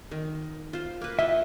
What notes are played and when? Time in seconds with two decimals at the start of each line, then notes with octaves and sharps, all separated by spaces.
0.11 D#3
0.73 F4 C5
1.01 A#3 B4
1.19 E4 F4 D#5 E5